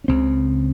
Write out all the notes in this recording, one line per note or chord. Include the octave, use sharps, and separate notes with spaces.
C#4
C#2 C#3 C4